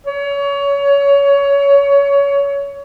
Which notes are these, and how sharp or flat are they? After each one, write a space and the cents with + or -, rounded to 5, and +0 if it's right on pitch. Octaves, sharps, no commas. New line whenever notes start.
C#5 +25